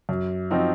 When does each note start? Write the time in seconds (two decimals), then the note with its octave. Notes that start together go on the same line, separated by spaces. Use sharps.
0.09 F#2
0.51 F3 C4 D#4 F#4